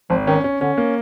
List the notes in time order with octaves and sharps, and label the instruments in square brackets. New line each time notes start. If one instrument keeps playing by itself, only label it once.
[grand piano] G#1 [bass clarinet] F3
[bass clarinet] D#3 [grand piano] C#4
[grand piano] C#4
[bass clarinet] D3 [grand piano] C#4
[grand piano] A#3